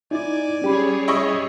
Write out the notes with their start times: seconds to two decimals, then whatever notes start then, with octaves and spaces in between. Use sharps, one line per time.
0.11 D#4 E4 D5 G#5
0.62 G3 C#4 G4 G#4 C#5 B5
1.08 E4 D#5 C#6